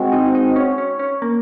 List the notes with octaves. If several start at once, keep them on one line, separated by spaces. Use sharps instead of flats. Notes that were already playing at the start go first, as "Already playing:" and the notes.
Already playing: G#3 C4 F#4
D#4
D#4
C#4
C#4
C#4
A#3